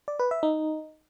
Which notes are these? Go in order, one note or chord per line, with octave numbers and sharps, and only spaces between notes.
D5
B4
E5
D#4